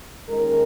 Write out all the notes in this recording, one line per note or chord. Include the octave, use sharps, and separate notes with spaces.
D#2 D#3 G#3 C#4 A#4